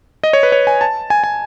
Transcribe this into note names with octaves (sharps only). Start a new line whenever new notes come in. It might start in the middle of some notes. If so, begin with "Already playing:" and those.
D#5
C#5
B4
C#5
G#5
A5
G#5
G#5